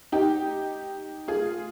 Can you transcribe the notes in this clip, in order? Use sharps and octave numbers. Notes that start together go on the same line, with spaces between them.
D#4 G4
F4 G#4